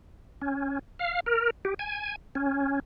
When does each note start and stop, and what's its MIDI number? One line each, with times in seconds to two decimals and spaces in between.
0.42 0.79 61
0.99 1.20 77
1.26 1.50 70
1.65 1.74 67
1.79 2.16 80
2.35 2.79 61